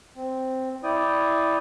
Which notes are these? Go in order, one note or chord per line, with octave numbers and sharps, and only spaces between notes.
C4
E4 D5 G5 D#6